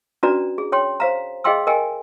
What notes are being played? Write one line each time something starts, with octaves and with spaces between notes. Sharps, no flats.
C#4 D4 F#4 B4 D5 A#5
G#4
C#5 G5 C6
C5 F5 A#5
G#4 D#5 F5 G5 C6 E6
A#4 D#5 G5 G#5